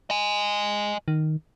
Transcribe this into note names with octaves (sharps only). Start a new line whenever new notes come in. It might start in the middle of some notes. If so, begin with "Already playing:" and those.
D#5 G#5
D#3